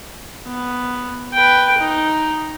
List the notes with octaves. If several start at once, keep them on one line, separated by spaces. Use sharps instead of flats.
B3
B4 G5
D#4